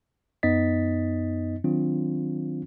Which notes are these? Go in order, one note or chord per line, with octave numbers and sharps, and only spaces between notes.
F#2 B3 D#4 D#5 A6 B6
D#3 F#3 C4 D4 F4